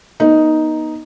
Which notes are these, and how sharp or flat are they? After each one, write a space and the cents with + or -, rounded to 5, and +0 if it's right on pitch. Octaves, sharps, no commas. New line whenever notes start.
B3 -35 D#4 +0